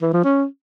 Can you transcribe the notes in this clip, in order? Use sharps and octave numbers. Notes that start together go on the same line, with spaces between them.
E3
F3
C#4